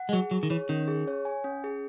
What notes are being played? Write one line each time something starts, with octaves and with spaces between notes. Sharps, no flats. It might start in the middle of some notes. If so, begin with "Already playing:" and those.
Already playing: F#5
G#3
F#3 G#4
F#3 G#4
D#3
E3 C#5
D#3 C#4
G#4
C#5
G#5
C#4
G#4